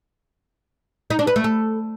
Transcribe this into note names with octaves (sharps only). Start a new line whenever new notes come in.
D#4
D4
B4
A3
A4